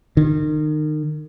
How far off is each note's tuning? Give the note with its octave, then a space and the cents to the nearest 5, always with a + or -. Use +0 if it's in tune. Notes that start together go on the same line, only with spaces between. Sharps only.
D#3 -30